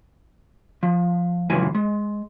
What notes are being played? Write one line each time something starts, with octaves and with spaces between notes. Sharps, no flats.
F3
C#2 F#2 E3 F3 G#5
G#3